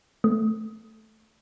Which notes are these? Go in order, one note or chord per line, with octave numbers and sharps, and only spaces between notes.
A3